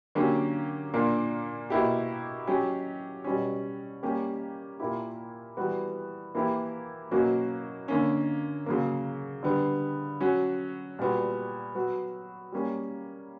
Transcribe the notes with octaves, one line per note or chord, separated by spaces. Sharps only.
D3 F#3 A#3 C#4 G4
A#2 A#3 D4
B2 A#3 E4 G4
F#3 C#4 G4
B2 G3 C#4
G3 A#3 C#4 G4
A#2 A#3 E4 G4
E3 G3 B3 F#4
E3 A#3 E4 G4
B2 F#3 A#3 C#4 F#4
D3 A#3 C#4
C#3 F#3 A#3
D3 G3 B3
F#3 C#4 F#4
A#2 G3 B3 F#4
F#3 B3 F#4
G3 A#3 C#4